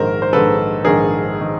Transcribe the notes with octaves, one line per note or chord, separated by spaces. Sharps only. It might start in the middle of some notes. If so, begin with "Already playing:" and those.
Already playing: A#1 G#2 D#3 A#4 C5
C5
A#1 G#2 D#3 A4 B4
A#1 G#2 D#3 G#4 A#4
D#3